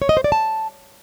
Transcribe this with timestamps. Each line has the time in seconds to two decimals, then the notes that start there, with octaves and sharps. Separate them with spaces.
0.02 C#5
0.09 D#5
0.17 C5
0.24 D5
0.32 A5